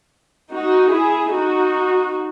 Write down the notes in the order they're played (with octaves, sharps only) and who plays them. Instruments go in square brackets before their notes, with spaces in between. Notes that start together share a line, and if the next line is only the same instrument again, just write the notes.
[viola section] D#4 F#4
E4 G#4
D#4 F#4